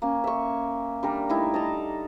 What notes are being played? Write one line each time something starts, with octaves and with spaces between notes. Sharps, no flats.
A#3 C#4
E5 C#6
G3 D4 A#4
G3 A3 D#4 E4
D#5 A5 A#5